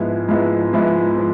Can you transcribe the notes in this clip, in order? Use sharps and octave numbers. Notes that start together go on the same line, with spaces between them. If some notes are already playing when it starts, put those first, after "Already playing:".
Already playing: G#2 F3 G#3 B3 E4
G#2 F3 G#3 B3 E4
G#2 F3 G#3 B3 E4
F3